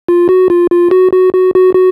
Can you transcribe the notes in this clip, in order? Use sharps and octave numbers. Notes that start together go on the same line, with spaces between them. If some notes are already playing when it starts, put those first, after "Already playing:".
F4
F#4
F4
F4
F#4
F#4
F#4
F#4
F#4